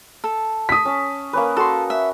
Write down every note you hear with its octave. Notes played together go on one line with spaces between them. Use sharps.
A4
D#6 B6
C#4 A5
A#3 C#4 B4
F#4 A4 C6
E5